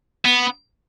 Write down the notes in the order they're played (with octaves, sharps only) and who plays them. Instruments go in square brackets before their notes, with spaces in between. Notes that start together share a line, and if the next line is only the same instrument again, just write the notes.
[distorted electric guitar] B3